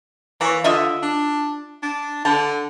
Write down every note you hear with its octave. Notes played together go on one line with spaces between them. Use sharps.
E3 A#3 C#5
D3 F4 D#5 E5
D4
D4
D3 A5